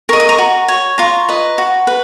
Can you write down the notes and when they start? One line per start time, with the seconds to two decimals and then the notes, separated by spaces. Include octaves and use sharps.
0.09 A#4 D#5 C#6
0.20 D#6
0.29 A#5 C#6
0.38 F#4
0.68 C#5
0.98 F4 A#5 C#6
1.29 B4 D#5
1.58 F#4
1.87 B4